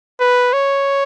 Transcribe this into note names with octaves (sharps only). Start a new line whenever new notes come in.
B4
C#5